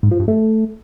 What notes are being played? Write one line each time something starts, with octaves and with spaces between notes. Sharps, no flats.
G#2
F3
G2
A3